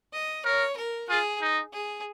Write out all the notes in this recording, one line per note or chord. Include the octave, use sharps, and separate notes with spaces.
D#5
A#4 C#5
A#4
F4 G#4
D#4
G#4